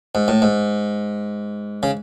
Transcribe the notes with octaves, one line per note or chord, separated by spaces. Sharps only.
G#2
A2
G#2
C#3